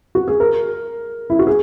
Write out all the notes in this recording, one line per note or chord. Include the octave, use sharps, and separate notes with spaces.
F#4
G#4
A#4
E4
F#4
G#4